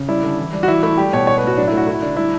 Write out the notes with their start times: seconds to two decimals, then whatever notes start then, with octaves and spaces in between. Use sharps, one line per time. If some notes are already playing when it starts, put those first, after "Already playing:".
Already playing: C#3
0.08 G3 E4
0.23 D3
0.39 E3
0.53 G3
0.63 F#4
0.68 E3 E4
0.83 A3 E4
0.97 G3 G4
1.13 B2 C#5
1.27 G3 C#5
1.38 B4
1.42 A2 F#4
1.57 F#3 D4
1.68 E4
1.72 A3
1.77 F#4
1.87 A3 E4
2.02 D3 D4
2.17 G3 E4